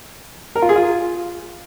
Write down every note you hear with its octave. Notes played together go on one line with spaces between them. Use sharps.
A#4
F4
G#4
F4